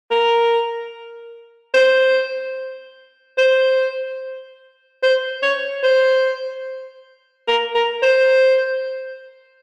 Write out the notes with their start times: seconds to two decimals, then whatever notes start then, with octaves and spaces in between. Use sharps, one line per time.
0.11 A#4
1.74 C5
3.38 C5
5.03 C5
5.43 C#5
5.83 C5
7.48 A#4
7.75 A#4
8.02 C5